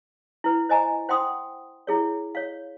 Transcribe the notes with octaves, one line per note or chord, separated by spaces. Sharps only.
E4 B4
C5 D#5 G#5 A#5
C5 F#5 G5 C6 D#6
E4 G#4 C#5
C#5 F5